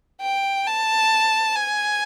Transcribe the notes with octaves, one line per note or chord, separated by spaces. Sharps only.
G5
A5
G#5